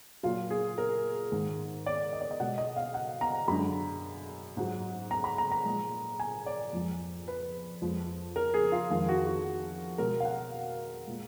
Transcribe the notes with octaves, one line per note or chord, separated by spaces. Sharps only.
A#2 F#3 F4
G#4
A#4
G#2 D#3 G#3
D5
D#5
D5
D#5
B2 G#3 F#5
D#5
F5
F#5
A#5
F#2 D3 G#3 B5
G#2 F#3
A#5
B5
A#5
A#5
A#2 F3 G#3
G#5
D5
F2 F3 G#3
B4
F2 F3 G#3
A#4
G#4
F4
F2 D#3 G#3 F4
F#4
F#4
B2 G#3 A#4
F5
F#5
A#2 G#3